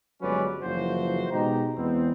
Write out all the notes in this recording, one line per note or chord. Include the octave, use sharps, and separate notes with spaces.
G1 F#3 G#3 C#4 B4 D5
F#1 E3 F3 F#4 C5
B2 G#3 D#4 G4 A#5
E2 G#3 B3 C4